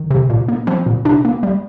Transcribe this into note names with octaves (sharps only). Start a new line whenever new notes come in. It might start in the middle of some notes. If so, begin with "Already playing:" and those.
Already playing: D#3
C3
A#2
A#3
F3 C4
A#2
C3 D4
A#3
G3